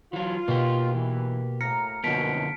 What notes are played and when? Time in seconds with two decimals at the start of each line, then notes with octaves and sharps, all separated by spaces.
0.13 E3 F#3 F4
0.48 B2 A#3 G4
0.93 E3
1.61 A2 A#3 A#5 F6 A#6 C#7
2.04 F#2 B2 D3 F3 A#3 A5 B6 D7